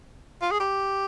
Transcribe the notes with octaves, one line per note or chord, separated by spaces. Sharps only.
F4
G#4
G4